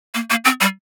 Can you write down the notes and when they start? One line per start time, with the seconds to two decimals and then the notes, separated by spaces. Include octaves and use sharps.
0.14 A#3
0.30 A#3
0.45 C4
0.61 G3